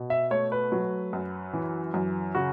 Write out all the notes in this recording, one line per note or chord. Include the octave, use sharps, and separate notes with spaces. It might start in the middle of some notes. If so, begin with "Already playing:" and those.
Already playing: B2
E5
A3 C#5
B4
F#3
F#2
E3
F#2
C#3 F#4